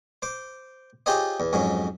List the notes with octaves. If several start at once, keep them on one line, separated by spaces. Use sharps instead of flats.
C5 D6
F4 G4 G#4 C5 C#5 D#5
E2
F2 G#2 F#3 C#4